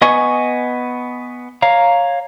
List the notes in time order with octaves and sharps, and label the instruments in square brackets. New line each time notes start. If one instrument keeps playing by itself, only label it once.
[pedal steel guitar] B3 D#5 G#5 C#6
C#5 F5 A#5